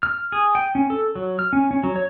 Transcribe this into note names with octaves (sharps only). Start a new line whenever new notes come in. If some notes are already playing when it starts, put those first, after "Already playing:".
F6
G#4
G5
C#4
A4
F#3
F6
C#4
C#4
F#3
C#5